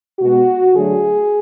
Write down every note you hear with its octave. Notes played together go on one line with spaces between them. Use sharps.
B2 G#3 B3 F#4
D3 F#3 A3 G#4